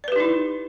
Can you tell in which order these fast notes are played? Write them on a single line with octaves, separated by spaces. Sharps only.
D5 B4 G4 D#4 E4